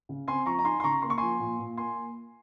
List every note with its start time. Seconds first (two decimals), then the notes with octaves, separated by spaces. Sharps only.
0.09 C#3
0.28 C4 G#5 C6
0.46 F3 A#5 C#6
0.59 A#5
0.65 D#4 G#5 C6
0.80 C6
0.84 C#3 A#5 C#6
1.02 A#3 C6
1.10 C#6
1.18 F3 G#5 C6
1.40 A#2
1.59 A#2
1.77 A#3 G#5 C6